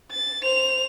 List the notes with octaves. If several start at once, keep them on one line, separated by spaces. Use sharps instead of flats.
A6
C5 F7